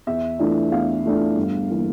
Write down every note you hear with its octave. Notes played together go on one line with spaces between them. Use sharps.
E2 E5
E3 A3 D4 F4
E2 F5
E3 A3 D4 F4
G1
E3 A#3